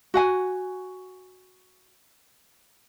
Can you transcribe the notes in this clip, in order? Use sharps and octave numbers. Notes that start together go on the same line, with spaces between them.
F#4 F#5 G#5